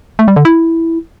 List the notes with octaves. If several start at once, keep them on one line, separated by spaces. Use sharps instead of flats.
A3
G3
D3
E4